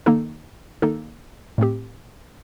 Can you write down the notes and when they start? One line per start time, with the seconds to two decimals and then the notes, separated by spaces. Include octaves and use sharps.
0.06 D#3 A#3 D#4 A4
0.82 D#3 A#3 D#4 A4
1.58 A2 A3 C4 G4